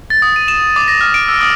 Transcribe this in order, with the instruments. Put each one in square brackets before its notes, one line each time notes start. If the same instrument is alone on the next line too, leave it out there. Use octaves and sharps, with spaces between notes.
[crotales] A6
D#6
D#7
E7
D6
A#6
F6
D7
E6
D#6